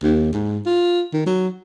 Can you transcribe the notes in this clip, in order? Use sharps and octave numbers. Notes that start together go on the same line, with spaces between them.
D#2
G#2
F4
D#3
F#3